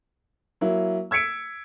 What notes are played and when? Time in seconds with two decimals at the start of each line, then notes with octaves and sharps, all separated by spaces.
0.61 F#3 A#3 E4
1.11 E6 G#6 B6 C#7 D7